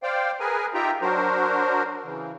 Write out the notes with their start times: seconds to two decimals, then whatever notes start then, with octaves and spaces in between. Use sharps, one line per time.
0.03 C5 D5 F5 G5
0.40 G#4 A#4 B4 G#5
0.74 D#4 F4 G4 E5 G5 A#5
1.02 F#3 D4 F#4 A#4 C5
2.05 C#3 E3